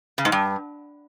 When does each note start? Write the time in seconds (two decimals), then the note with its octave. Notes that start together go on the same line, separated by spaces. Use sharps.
0.18 C#3
0.25 G#2
0.32 G2